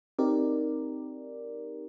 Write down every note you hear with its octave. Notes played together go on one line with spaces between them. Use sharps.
C4 D#4 G4 A#4 D5